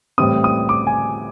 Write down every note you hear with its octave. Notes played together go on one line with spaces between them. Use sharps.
A2 E3 G3 C4 D#6
D#6
D6
G#5